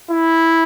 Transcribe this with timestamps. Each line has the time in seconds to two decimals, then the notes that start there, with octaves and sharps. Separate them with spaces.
0.10 E4